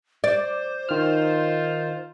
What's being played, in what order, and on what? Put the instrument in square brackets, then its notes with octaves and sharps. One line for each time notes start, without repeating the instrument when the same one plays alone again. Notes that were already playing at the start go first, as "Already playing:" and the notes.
[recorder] C5 [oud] D5
[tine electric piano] D#3 F6 [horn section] D#4 F4